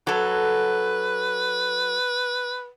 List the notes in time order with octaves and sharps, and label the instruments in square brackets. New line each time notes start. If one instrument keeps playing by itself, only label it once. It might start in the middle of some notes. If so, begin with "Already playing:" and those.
[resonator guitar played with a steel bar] F#3 A4 [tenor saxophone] B4